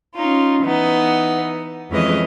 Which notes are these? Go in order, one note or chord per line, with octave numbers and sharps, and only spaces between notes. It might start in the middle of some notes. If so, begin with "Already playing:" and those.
C#4 D#4 F4
E3 B3 D#4
F2 E3 G#3 C#4 B4 D#5